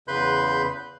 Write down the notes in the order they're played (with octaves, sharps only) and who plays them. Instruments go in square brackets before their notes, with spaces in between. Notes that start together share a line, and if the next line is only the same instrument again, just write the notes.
[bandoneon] E2 C#3 B4 B5 C6 G6